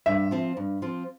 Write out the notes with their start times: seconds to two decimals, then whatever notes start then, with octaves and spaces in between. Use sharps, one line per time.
0.06 G2 E5
0.31 F3 C4 F4
0.57 G2
0.82 F3 C4 F4